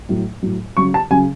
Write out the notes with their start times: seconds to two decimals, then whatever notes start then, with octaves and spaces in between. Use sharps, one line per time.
0.09 A2 F#3
0.43 A2 F#3
0.77 C#3 F#3 C#6
0.94 A5
1.10 C#3 F#3 G#5